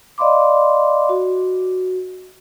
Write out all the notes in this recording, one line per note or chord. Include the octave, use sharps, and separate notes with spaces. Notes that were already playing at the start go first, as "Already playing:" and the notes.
D5 D#5 F5 B5 C6 D6
F#4